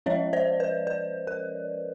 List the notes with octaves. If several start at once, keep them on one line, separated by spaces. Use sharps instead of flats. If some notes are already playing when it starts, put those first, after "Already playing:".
F3 G#3 C#4 C#5 D#5
C5 D5
B4
B4
A#4